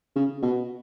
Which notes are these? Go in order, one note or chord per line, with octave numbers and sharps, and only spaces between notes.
C#3
B2